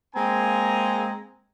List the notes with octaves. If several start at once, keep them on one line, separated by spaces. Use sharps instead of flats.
G#3 A#3 C4 G#5 A#5